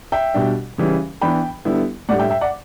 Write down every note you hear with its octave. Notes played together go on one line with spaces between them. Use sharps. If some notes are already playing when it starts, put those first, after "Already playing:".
E5 G5
B2 G3 D4
C#3 E3 G3
E3 B3 D4 G5 B5
D3 G3 B3 E4
A2 G3 D4 D5 F#5
E5 G5
E5 G5
D5 F#5